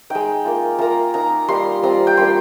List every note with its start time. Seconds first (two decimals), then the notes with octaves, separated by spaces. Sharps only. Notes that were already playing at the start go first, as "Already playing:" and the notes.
0.10 G#3 D#4 G5
0.45 A#3 F4
0.79 A#3 F4 A#5
1.14 A#3 D#4 A#5
1.48 G3 A#3 D#4 C6
1.83 G3 C4 F4 A#5
2.07 G5
2.17 G3 A#3 D4 F4 C6